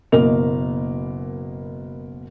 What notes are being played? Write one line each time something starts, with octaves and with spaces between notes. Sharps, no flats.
F#1 B2 A#3 D#5 F7